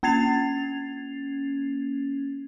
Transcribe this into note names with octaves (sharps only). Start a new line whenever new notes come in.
A#3 C#4 G#6 A6 C7 F7